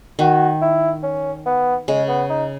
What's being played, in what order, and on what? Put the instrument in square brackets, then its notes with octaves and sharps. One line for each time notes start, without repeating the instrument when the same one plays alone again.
[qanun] D#3 [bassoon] F#4
[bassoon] E4
C#4
B3
[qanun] C#3 [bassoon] G#3
[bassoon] B3
D#4